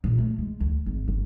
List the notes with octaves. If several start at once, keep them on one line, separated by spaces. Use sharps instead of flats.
A#2
A3
G#3
D2
G#1
G1